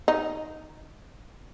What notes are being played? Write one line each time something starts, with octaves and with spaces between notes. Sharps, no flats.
D#4